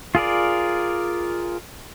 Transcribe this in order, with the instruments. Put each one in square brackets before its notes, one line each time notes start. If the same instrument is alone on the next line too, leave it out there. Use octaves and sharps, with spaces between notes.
[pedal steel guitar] F4 G#4 A#4 D5